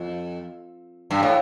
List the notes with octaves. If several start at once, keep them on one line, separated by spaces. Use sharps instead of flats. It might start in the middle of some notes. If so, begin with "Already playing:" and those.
Already playing: F2
G2
A2